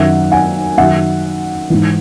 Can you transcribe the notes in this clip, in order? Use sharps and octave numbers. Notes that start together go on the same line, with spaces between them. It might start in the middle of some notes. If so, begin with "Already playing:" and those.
Already playing: F#2 D#3 F#3 E5 F#5
F#5 G#5
F#2 D#3 F#3 E5 F#5
G#2 E3